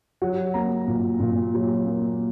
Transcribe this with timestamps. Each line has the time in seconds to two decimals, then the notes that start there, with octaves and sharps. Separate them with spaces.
0.22 F#3 F#5
0.54 A#3 A#5
0.88 A#2
1.20 A#2
1.54 F#3
1.86 A#3